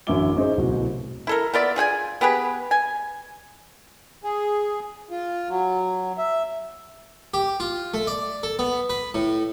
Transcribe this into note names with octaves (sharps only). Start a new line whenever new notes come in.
A1 F#2 D3 E4 D6 G7
C#4 D#4 G#4 C5
D1 C2 B2 F#4
E4 A4 A#4
B3 F4 D5 E5
F4 G#4 G5 G#5
B3 G4 G#4 B4
G#5
G#4
F4
F#3
E5
G4
F4
A3
D5
A4
B3
B4
A2